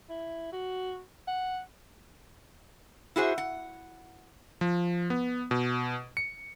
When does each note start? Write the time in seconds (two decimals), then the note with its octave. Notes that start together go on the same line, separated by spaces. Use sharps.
0.09 E4
0.52 F#4
1.27 F#5
3.16 E4 F#4 G#4 C5
3.38 F#5
4.61 F3
5.10 B3
5.51 B2
6.17 C#7